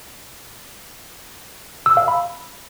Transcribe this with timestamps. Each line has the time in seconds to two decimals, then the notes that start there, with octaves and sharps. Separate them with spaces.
1.86 E6
1.97 F5
2.08 B5